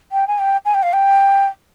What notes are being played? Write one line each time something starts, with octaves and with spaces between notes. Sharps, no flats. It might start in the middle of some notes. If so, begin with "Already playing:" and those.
G5
G#5
G5
G#5
G5
F5
G5